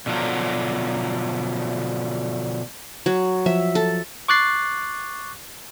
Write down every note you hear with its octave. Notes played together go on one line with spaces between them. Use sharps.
B2 D3 F3 F#3
F#3
F3 E5
A4
C#6 D6 F#6 A6 C7